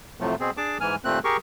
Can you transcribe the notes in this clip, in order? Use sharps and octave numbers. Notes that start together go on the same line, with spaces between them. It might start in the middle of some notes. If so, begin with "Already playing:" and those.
F2 A2 C3 F3 F#3 A3
B2 C4 G#4
D4 G#4 A5 D6
G#2 E3 G#5 F6
D#2 A#2 A3 C4 F#6
G4 G#4 A#4 C#6